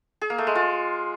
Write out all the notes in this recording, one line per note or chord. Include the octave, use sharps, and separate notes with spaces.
G#4
A#3
A3
G#3
F4